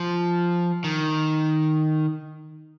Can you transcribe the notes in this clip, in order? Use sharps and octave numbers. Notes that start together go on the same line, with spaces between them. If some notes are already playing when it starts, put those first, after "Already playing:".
Already playing: F3
D#3